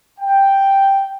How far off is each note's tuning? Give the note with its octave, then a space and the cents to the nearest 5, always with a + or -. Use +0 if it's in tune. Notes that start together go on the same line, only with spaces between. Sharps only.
G5 +0